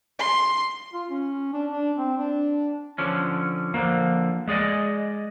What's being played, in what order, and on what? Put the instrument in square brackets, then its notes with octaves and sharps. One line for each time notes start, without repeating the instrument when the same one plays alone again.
[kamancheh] C6
[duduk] F4
C#4
D4
D4
C4
D4
[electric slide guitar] D3 F3 C#4
D3 F3 A#3
G#3 G#4 D5 D#5